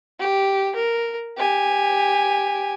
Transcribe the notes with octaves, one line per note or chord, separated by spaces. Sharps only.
G4
A#4
G4 G#5